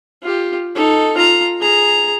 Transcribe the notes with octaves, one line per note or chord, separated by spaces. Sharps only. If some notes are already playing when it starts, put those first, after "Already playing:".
F4 G4
D#4 A4
F4 A#5
G#4 A#5